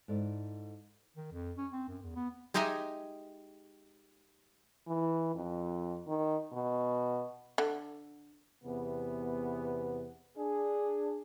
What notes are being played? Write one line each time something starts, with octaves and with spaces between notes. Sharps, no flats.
G#2 E4 A4 D5
D#3
F2
C#4
C4
F#2
E2
B3
G#3 D#4 G4 D#5 E5 G#5
E3
F2
D#3
B2
D3
E2 C3 B3
D4 G#4